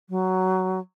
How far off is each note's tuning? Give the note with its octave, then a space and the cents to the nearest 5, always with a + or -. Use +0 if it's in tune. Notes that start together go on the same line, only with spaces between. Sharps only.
F#3 +10